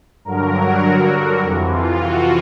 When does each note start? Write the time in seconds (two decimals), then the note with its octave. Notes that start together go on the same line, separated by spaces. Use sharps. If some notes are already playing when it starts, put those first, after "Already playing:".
0.25 G2 D3 F#3 A#4
0.54 F#4
1.43 F2 C3 E3
1.71 F4
2.01 F#4